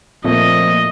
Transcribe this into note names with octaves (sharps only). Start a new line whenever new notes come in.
A#2 F3 A3 A#3 C4 D#5